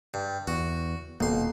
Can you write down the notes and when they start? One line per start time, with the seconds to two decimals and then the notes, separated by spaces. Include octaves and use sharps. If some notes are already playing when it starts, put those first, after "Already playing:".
0.14 G2
0.47 E2 F#4
1.20 D#1 B1 A#3 C6